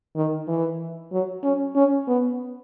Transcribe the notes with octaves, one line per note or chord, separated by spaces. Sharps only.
D#3
E3
F#3
C#4
C#4
B3